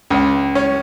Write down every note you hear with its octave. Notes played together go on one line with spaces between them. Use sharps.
C#2
C#4